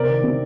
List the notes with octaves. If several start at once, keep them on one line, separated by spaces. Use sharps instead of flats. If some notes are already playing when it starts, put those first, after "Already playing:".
Already playing: C3 A#4 D5
D#3
C3